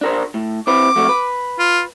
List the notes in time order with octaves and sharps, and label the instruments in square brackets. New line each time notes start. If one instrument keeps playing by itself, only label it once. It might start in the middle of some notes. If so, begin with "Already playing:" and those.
[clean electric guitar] D4 A#4 C5
A2
[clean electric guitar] C4 E4 B4 [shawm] D6
[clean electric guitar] F2 A3 F#4
B4
[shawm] F4